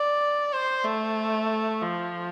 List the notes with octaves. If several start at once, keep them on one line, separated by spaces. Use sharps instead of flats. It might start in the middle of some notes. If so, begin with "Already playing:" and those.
Already playing: D5
C5
A3
F3